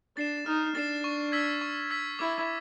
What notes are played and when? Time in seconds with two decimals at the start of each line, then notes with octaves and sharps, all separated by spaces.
0.17 D4 A6 C7 E7
0.46 D#4 F6
0.75 D4 A6 C7 E7
1.04 C#6
1.32 E6 G#6 B6
1.61 C#6
1.90 E6 G#6 B6
2.19 E4 D6